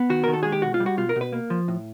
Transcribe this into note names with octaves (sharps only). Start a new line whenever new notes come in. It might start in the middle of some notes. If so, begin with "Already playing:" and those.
Already playing: B3
D#3 F#4
D#3 A#4
A4
G#3 G#4
G4
B2 F#4
F4
G3
F#4
B2 F4
A#4
B2
B4
A#3
F3
A2